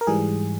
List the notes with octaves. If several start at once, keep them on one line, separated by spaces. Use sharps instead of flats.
A#4
G#2 E3 G3 G#4